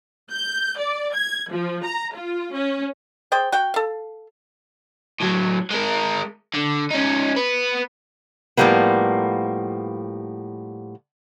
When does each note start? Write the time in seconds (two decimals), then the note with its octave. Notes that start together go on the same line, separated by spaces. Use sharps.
0.31 G6
0.78 D5
1.13 G#6
1.51 F3
1.84 A#5
2.14 F4
2.51 C#4
3.32 G#4 C5 D5 G5
3.52 F#4 F#5 G5
3.74 A4 F5
5.20 A2 F#3
5.71 G#3 A#4
6.54 D3
6.90 C#4 D#4
7.36 B3 B4
8.57 A2 F3 G3 A#3 B3